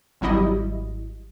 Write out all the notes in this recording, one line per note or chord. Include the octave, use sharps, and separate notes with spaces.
G#1 F#3 G3 E4 D#5